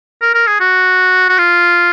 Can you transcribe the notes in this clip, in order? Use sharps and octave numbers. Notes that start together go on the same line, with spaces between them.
A#4
A#4
G#4
F#4
F#4
F4